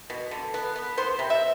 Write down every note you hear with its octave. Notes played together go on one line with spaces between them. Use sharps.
B2
D3
B3
B3
B3 C5
C3
E5